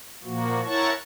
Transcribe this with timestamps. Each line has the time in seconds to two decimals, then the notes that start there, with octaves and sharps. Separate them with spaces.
0.24 A#2 F3 A#3 F#4
0.65 E4 A#4 C#5 F#5 A5 C#6